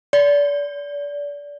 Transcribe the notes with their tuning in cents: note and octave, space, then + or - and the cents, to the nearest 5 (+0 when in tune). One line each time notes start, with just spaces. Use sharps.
D5 -30